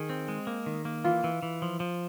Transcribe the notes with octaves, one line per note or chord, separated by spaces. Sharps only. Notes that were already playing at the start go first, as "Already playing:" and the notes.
Already playing: D#3 G#4
C4
G#3
A#3
D#3
A#3
E3 F4
E3
E3
F3
F3